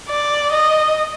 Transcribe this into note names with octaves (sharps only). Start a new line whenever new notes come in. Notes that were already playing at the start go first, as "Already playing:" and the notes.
D5
D#5